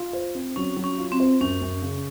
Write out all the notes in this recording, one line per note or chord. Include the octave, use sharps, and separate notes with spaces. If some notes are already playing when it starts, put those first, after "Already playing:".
Already playing: F4
C5
C4
F#3 C#4
F#3
C#4
F4
C4
C5
F#2 C#4
F#2
C#3